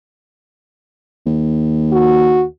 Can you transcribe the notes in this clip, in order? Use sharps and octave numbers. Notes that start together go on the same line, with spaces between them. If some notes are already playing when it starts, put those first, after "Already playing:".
D#2
F#4